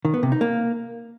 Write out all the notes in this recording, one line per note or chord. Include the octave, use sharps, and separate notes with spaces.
D#3
B3
C3
D#4
A#3